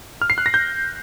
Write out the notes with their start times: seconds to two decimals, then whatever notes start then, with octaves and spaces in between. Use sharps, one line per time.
0.22 F6
0.30 C7
0.38 F#6
0.46 A#6
0.54 G6